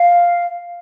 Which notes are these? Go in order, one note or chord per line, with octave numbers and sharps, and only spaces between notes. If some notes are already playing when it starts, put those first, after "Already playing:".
Already playing: F5